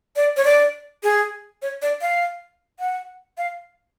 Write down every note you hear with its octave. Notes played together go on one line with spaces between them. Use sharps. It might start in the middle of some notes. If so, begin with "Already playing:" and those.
D5
C#5
D5
G#4
C#5
D5
F5
F#5
F5